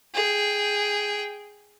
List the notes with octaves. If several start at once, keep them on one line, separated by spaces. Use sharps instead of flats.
G#4 G5